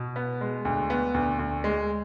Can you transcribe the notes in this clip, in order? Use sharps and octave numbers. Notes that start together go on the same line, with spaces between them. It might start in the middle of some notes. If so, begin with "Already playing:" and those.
Already playing: B2
B3
G#3
D2
B3
D2
D2
G#3